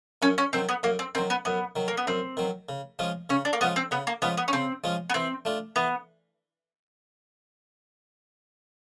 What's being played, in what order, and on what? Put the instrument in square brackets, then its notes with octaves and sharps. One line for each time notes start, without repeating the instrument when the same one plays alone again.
[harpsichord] F#2 [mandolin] C#4
[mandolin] C#4
[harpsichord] D#3 F#3 [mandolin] C4
[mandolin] B3
[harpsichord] F#2 [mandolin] A#3
[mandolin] C4
[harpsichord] D#3 F#3 [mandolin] C4
[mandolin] B3
[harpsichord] F#2 [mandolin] B3
[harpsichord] D#3 F#3
[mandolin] A#3
B3
[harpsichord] F#2 [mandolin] C4
[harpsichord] D#3 F#3
C#3
F3 G#3 C#4 F4
[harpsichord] C#3 [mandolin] C#4
[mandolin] D4
A#3
[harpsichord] F3 G#3 C#4 F4 [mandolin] B3
[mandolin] C4
[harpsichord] C#3 [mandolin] B3
[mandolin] A#3
[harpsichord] F3 G#3 C#4 F4 [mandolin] B3
[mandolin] B3
C#4
[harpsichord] C#3 [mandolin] C4
[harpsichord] F3 G#3 C#4 F4
[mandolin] B3
[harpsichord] E3 [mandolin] C4
[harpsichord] A3 D4 F4
[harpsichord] E3 [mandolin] B3